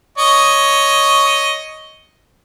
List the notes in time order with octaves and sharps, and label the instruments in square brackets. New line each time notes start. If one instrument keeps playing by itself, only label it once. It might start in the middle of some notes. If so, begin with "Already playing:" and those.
[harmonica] C#5 D#5